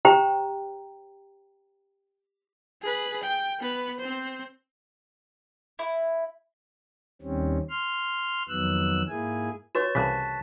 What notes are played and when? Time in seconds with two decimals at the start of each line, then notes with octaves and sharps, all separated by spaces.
0.05 G4 C5 G5 A#5
2.82 G#4 B4
3.23 G5
3.59 B3 B4
4.00 C4 C5
5.79 E4
7.22 D#2 D#3 G3 C4 C#4
7.70 C6 F6
8.49 F2 D#3 F#3 B3 E6 F#6
9.09 G#2 A#3 E4 G#4 G#5
9.75 F#4 B4 C#5 C#6 A6 E7
9.95 C2 C#3 E3 A5 F#6 B6